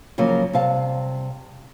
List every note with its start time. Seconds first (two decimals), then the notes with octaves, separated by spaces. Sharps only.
0.18 C#3 F3 F#3 A#3
0.53 C3 G3 F5 A5